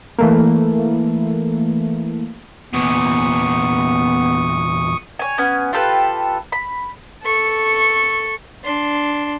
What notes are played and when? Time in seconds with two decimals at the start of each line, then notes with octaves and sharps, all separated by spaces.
0.19 E3 A3 A#3
2.73 E2 A#2 B3 C#6 D#6
5.19 C#5 G#5
5.38 B3 C#4 G#5
5.73 F4 G4 A4 B4
6.52 B5
7.23 A4 C#6
8.64 D4 C6